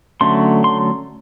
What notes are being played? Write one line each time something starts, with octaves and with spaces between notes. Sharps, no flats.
D3 F#3 A3 C#4 C6
C6